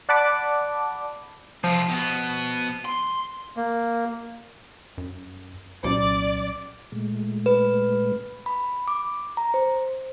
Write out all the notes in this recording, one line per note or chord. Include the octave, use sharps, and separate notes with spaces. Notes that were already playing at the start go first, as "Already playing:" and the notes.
D5 F#5 A5 B5 D6
C3 F3 F4
B2 B3
C6
A#3
F#2
C2 A#2 F#3 C#4 D5
A#2 G#3 A3
B4
B5
D6
A#5
C5